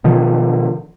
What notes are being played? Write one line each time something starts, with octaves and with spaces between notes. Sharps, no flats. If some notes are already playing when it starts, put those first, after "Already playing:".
B2 D#3 F3